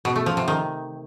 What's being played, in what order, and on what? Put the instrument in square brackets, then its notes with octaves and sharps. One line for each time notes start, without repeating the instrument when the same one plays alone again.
[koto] B2
A3
F3
C3
D#3